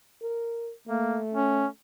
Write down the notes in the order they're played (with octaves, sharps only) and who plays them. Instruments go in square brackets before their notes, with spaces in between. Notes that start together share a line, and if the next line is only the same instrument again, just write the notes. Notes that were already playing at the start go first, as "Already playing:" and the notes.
[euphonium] A#4
[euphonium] A3 [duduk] A#3
[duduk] C#4